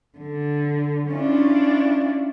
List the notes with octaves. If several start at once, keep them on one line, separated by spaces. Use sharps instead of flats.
D3
C#4 D4 E4 F4